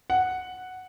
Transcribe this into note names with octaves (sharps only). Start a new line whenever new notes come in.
F#5